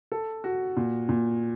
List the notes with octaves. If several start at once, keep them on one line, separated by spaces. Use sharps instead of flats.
A4
F#4
A#2
A#2